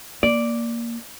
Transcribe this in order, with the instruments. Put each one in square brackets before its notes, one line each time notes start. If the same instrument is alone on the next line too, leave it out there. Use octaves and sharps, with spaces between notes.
[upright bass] A#3 [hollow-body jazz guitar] D5